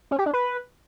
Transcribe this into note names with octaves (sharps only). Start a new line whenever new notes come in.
C#4
G4
D4
B4